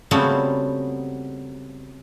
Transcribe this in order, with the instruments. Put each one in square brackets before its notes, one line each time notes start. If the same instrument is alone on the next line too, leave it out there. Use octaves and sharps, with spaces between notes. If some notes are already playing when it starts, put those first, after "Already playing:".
[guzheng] C#3 F#3 G3 A3 B3 C4